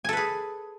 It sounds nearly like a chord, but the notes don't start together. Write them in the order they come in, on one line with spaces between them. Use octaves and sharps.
G#5 A4 B4 G#4